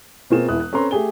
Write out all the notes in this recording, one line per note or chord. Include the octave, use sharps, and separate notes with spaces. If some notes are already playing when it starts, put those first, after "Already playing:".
B2 A#3 C4 F4 G#4 E7
E1 E3 E4 D#6 F#6
F#6
C4 C#4 A4 B4 A#5 C6
A3 G4 G#4 G7